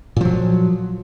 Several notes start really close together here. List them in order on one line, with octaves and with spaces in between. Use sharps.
A#2 F3 F#3